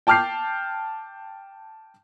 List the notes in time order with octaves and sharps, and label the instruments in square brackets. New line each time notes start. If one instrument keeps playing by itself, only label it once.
[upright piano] G5 A5 D6 F6 G6 C7